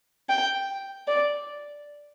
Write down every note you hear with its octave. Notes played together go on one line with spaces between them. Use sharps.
G5
D5